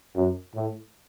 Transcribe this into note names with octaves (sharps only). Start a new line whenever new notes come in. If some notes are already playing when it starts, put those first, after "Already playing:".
F#2
A2